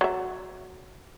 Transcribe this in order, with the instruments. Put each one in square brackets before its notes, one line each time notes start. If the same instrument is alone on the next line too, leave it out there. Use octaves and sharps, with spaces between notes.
[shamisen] F#3 E5